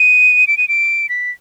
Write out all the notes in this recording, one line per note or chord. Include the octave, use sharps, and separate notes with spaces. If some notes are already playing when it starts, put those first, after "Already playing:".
Already playing: D#7
D7
D#7
D7
B6